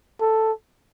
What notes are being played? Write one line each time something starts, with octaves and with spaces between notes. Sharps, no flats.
A4